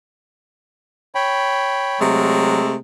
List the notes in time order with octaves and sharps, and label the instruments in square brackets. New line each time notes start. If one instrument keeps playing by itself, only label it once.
[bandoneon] C#5 G5 B5
[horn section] C3 G#3 A3 [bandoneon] F#3